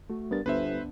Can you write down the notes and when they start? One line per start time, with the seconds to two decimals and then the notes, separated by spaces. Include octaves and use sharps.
0.10 A3 F#4
0.31 G2 B3 A#4 A6
0.46 G1 D2 B3 D4 B4 C5 E5